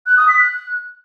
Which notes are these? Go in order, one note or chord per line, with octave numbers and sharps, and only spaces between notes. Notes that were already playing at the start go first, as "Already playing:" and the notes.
F#6
D#6
B6
F#6